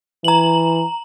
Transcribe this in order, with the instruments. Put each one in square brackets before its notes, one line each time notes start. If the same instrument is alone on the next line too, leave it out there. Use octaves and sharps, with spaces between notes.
[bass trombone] E3 [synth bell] A#5 F#7